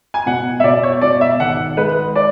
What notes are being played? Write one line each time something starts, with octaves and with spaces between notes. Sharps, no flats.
G#5
B2 F#5
E5
B2 D5
C#5
B2 D5
E5
G#1 F#5
G#3 B4
D5